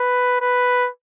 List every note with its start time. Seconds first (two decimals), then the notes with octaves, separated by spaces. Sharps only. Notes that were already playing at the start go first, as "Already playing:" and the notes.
Already playing: B4
0.41 B4